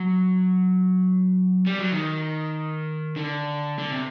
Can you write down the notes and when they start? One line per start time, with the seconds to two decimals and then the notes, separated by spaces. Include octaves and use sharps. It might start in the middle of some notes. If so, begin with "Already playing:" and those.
Already playing: F#3
1.66 G3
1.79 F#3
1.92 D#3
3.16 D3
3.79 D3
3.91 C3